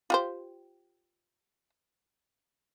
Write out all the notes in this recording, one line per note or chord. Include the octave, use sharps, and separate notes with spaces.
F4 G4 C5